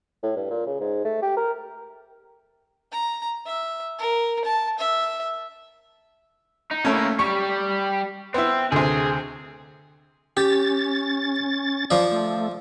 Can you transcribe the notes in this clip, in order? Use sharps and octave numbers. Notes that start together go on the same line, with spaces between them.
A2
G2
A#2
C#3
G#2
A3
G4
A#4
A#5
E5
A#4
A5
E5
D#4
A2 A3 A#3 C#4
G3 G4 C#6
B3 C4 E4
D2 C3 G#4
C#4 G4 A6
F3 D5
A3